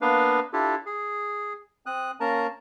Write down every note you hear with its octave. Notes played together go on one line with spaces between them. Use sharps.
A#3 B3 D4 B4 F5
D4 E4 F4 G4 A4
G#4
C4 D#6 F#6
A#3 C#4 A#4 A5 A#5